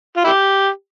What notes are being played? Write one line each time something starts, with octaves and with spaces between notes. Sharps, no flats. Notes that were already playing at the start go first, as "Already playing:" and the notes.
F4
E4 G4